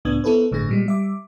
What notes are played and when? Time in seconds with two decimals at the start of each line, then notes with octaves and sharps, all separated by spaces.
0.05 C#2 A2 B3 D4 D#6 G#6
0.24 B3 E4 A4 B4 C5
0.52 G1 A2 D3 G#4 A#6
0.69 A#2 G3 G#3
0.86 G3 E5 D6